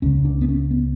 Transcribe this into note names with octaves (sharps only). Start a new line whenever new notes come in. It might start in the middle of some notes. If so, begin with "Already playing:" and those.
C#2 C#3 C#4
D4
B3
C#4
B3